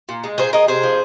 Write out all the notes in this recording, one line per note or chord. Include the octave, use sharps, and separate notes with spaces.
A#2
G#3
A#2 G#4 C5
G#3 A#4 D#5
C3 G#4 C5
F3